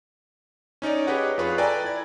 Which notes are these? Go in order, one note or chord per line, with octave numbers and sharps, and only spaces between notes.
C#4 D#4 C#5 D5
G4 G#4 B4 C#5 D#5 F#5
F2 F4 G#4 B4 C#6
A4 B4 D5 G5 G#5 A#5
E4 D5 G#6